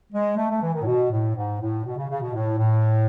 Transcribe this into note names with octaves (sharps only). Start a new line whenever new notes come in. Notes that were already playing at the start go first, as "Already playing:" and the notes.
G#3
A3
A3
E3
D#3
A2
B2
A2
G#2
A2
B2
C#3
C#3
B2
A2
A2